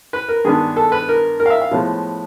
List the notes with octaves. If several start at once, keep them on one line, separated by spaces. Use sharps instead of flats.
B4
A#4
G2 D#3 G#3 B3 D4 G#4
A4
B4
A#4
A#4
F5
E5
F5
A2 F3 G#3 B3